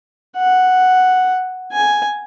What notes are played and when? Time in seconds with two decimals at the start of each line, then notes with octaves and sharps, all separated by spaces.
0.37 F#5
1.73 G#5